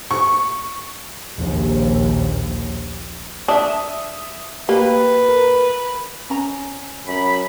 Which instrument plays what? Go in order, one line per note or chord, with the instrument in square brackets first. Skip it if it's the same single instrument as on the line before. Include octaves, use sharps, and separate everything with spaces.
[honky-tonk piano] C#6
[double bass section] A#1 D#2
[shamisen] D4 [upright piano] E5 D#6
[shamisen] A#3 [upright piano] G4 [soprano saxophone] B4
[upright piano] A#4
[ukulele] C#4 A#5
[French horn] F#2 [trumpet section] B5